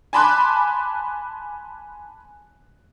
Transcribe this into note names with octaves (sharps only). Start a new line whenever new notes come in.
G#5 A5 B5 C6 D6 F#6